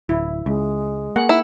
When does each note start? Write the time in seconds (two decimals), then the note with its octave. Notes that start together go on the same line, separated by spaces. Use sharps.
0.09 D1 E4
0.46 C#2 G#3
1.16 A#3 G#4 F#5
1.29 D#4 E4 E6